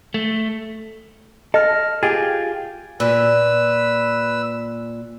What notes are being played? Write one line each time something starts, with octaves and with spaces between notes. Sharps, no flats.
A3
A4 D#5 F6 A#6
F4 G4 G#4 G5 G#6 A6
A#2 B4 E6